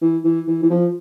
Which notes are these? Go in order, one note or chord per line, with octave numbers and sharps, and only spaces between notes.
E3
E3
E3
E3
F3